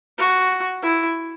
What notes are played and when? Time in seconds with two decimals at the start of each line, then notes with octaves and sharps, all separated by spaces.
0.18 F#4
0.83 E4